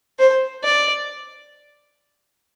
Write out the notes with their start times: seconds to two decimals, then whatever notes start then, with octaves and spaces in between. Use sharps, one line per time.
0.19 C5
0.64 D5